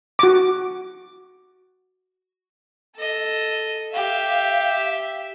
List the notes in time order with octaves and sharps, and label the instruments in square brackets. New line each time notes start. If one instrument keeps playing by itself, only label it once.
[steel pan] F#4 D6
[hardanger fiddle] A4 D#5
[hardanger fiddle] G4 E5 [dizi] F5